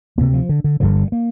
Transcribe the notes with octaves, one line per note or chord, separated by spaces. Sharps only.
D2 C3 A#3
F3
D3
D3
G1 G2 D3 F3
G3
A#3